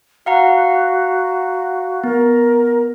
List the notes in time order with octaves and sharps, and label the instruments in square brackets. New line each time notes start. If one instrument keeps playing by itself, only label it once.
[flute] F#4 [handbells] F5 F#5 A#5
[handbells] B3 [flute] A#4